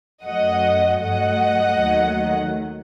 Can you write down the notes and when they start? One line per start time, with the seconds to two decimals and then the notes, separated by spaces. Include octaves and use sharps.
0.25 F#2 F#3 A3 D#5 F#5
1.01 G2 F#3 A3 D#5 F#5
1.78 D#2 D#3 F#3 A3